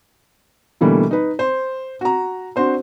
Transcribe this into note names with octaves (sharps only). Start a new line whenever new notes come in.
B2 D3 E3 G3 A3 A#3
D#4 B4
C5
F#4 A#5
C4 D4 F#4 C5 C6